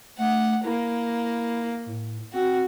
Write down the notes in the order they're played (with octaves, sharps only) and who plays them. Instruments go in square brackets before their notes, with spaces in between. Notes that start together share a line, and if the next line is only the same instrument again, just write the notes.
[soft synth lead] A3 [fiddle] F#5
[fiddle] A#3 [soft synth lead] E4
[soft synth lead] A2
[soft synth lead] C4 [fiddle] F#4